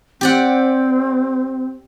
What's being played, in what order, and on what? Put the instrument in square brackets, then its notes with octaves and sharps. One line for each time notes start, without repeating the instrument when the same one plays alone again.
[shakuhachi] C4 [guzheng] G4 D5 F#5